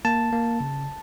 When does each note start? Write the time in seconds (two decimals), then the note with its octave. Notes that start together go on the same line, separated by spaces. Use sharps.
0.05 A#3 A5
0.33 A#3
0.60 C#3